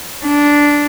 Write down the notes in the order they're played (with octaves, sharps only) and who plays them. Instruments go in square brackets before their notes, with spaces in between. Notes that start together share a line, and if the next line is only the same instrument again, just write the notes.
[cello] D4